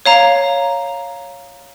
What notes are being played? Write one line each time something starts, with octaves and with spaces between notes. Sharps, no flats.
C#5 F5 A#5